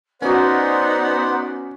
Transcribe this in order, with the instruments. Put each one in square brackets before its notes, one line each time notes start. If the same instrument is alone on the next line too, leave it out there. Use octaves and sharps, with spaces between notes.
[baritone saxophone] B3 [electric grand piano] C#4 F#4 [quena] D#4 [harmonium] C5 D5 F#5